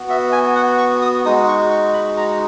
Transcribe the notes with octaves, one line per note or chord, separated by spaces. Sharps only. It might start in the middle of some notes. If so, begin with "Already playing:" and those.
Already playing: B3 F#4
E5
G#5
F#5
C#6
D#6
G#3 D#4 F#4 D#6
C#6
C#6
B5
A#5